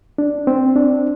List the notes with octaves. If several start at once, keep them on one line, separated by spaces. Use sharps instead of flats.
D4
C4
D4